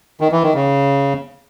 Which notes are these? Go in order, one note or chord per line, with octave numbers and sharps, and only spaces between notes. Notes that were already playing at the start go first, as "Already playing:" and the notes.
D#3
E3
D#3
C#3